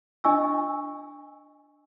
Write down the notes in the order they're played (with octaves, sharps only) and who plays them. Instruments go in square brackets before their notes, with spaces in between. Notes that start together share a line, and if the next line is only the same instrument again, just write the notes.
[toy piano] D4 D#5 G#5 C#6 E6